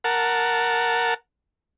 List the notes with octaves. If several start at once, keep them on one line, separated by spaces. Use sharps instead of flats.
A#4 F#5 A5